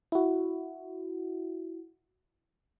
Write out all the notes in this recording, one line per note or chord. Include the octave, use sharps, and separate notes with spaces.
E4 F#4